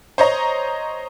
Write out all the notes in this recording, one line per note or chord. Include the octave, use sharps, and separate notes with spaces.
C5 C#5 D#5 A#5